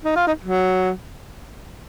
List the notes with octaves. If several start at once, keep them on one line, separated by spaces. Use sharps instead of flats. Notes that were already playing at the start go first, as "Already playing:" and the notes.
D#4
F4
D#4
F#3